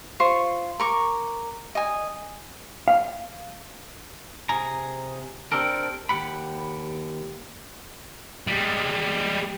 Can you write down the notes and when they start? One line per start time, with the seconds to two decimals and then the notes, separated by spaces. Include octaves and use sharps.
0.20 F4 C5 C#6
0.80 A#4 C#6 D6
1.75 D#5 G#5
2.88 F5
4.49 C3 G#4 G#5 A#5
5.52 C4 D4 G4 A4 A#4
6.09 D#2 G#3 G4 F#5 B5
8.47 G3 G#3